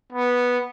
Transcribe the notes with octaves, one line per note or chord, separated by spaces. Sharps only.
B3